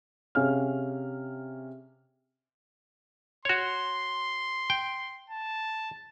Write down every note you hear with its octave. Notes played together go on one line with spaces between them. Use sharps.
C3 C#4 G#4 F5 F6
F#4 C#5 C6
G5
A5